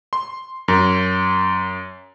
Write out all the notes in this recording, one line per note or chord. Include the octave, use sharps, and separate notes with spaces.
C6
F#2